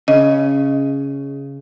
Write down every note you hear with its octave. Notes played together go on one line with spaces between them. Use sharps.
C#3 D#5